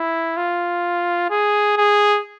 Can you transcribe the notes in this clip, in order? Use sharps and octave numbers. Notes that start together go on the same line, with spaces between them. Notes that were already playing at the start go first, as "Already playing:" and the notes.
Already playing: E4
F4
G#4
G#4